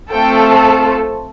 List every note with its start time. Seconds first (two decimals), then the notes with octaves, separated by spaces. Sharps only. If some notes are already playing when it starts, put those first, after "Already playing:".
0.12 A3 C4 F4 A4 G5